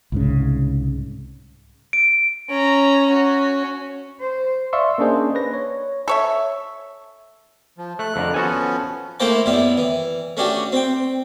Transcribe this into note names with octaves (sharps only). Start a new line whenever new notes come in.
C2 G#2 C#3
D7
C#4 A#5
C#4 F#4
C5
D5 E5 F5 C6 C#6 E6
A#3 C#4 D4 G#4 C5 D#5
B4 A#6
C#5
A4 C#5 E5
F3
A3 F#6
F2 D3 A#4
F3 B3 C#4 F#4 A4 G#5
A3 A#3 E4 C5 G5 A5
F#2 G3 B3 E4
E3
A3 C#4 D4 F#4 G4
C4 G5